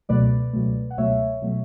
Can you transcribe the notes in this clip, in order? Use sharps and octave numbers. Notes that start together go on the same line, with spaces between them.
C#2 B2 F#3 A3 B4 D5
C#2 B2 F#3 A3
F#5
C#2 B2 F#3 A3 C#5 E5
B2 F#3 A3